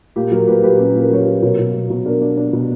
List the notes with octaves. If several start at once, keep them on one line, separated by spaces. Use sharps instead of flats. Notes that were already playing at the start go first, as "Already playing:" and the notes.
A#2 G4
F#3 A#4
A#2 G4 B4
A#2 G4 B4
C#4 G4
A#2 A#4
F#3 C#5
G4 B4
F#3
B2 A#4 C#5
B2
B2
B2
D4 A#4
D4
D4
B2